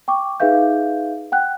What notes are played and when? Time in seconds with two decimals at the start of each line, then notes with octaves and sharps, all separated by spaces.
0.08 G5 C#6 D6
0.40 D#4 G#4 B4 E5 F5 G6
1.32 F#5 G5 F#6